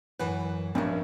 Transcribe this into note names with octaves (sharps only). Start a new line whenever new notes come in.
F#2 E3 B4
A#1 G2 C#4 D4